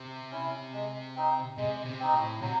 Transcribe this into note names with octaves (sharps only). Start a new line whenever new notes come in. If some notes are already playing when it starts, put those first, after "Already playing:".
Already playing: C3
C#4 E4
G#3
C4 D#4
C3 G#3
C3
C4 D#4
A2
C3 F#3